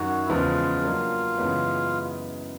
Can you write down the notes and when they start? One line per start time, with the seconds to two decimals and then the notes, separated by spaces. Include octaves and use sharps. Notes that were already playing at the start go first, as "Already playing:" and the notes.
Already playing: F#2 D#3 F#3 F#4
0.26 E4
0.29 E2 C#3 F3 G#3 B3 F4
0.83 F#3 A#3 D4
1.37 F#2 C#3 E3 G#3 B3